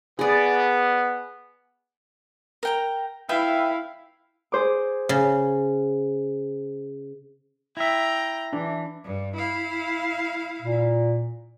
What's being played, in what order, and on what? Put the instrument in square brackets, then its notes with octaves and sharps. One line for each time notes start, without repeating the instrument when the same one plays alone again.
[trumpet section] B3 [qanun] G#4 D5
[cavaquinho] A#4 G5 A#5
[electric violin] E4 F5 [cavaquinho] B4 E5 G5
[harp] G#4 C5 D6
[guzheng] C#3
[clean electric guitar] E4 E5 [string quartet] G5 A#5
[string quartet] E3 [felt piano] D4
[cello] G2
E4 F5
[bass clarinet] A#2